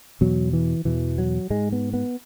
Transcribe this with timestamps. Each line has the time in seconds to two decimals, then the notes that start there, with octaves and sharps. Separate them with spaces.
0.21 E2 B2 F#3
0.53 E3
0.85 E2 B2 E3
1.18 F#3
1.50 G#2 G#3
1.72 B3
1.93 B3